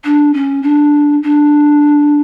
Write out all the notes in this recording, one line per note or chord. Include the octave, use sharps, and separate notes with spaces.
D4
C#4
D4
D4